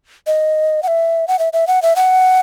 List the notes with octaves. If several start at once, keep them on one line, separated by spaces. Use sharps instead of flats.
D#5
F#5
E5
F#5
E5
E5
F#5
E5
F#5